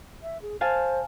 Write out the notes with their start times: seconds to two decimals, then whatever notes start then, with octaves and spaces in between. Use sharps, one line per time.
0.23 E5
0.42 G#4
0.61 C5 F5 G#5 A5